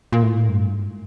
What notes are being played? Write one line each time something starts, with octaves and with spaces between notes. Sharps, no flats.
A#2
A2
G2
G#2